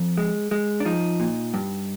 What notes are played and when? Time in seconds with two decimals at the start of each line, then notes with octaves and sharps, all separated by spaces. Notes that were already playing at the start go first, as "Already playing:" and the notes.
Already playing: F2
0.17 G#3
0.51 G#3
0.80 D4
0.85 F3 D#4
1.20 A#2
1.54 G2